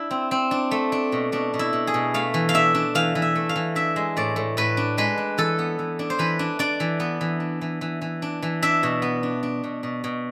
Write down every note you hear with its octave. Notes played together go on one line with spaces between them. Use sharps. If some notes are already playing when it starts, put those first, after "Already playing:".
Already playing: D4 E4
C4
C4
D4
A3
D4
B2
B2 D4
B2
E4
B2
G#4
B2
A3 F5
E3
F5
D4 E5
D4
E3 F5
E3
E5
A3
F5
E3
D4 E5
G#3
A2 D5
A2
A2 B4
D4
G#3 B4
D4
E3 A4
B3
E3
D4
C5
E3 B4
D4
D4 D5
E3
B3
E3
D4
E3
E3
E3
D4
E3
D4 E5
B2
B3
D4
D4
B2
B2
B2